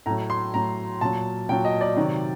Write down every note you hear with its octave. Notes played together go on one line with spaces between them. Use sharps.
A2 F#3 A#5
C6
A2 F#3 A#5
A#2 F#3 A5
A#2 F#3 G5
D#5
D5
C3 D#3 F#3